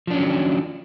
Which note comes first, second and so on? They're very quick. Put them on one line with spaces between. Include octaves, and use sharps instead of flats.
F3 D4 C#4 F#3 D#3